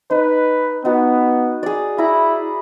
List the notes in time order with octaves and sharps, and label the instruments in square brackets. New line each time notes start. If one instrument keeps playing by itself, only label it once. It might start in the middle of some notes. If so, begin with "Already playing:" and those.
[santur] D#4 [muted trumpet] B4
[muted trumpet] B3 [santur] D#4 F#4
[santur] G#4 D5
[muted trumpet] E4 [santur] A#5 B5